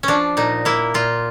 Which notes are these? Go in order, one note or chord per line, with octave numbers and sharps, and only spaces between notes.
F3 C#4 D4
A#2 D#4
A#3 E4
A#2 F4